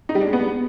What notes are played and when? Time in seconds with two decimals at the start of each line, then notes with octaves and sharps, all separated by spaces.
0.09 D#4
0.15 G3
0.21 D4
0.27 G#3
0.33 B3